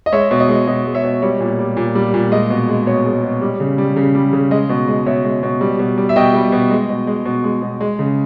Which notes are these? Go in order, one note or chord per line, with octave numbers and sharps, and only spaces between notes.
D#5
G#3 C#5 E5
B2
D#5
G#3
B2 D#5
G#3
C#5 E5
B2
G3 C#5
A#2
G3
A#2
G3
A#2
G#3 D#5
B2
G#3
B2 C#5
G#3
B2
G3
C#3
G3
C#3
G3
C#3
G#3 D#5
B2
G#3
B2 C#5 E5
G#3
B2
G3
B2
G3
E5
B2 D#5 G5
G3
B2
G#3
B2
G#3
B2
G#3
B2
G#3
C#3